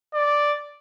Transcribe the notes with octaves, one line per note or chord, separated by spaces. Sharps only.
D5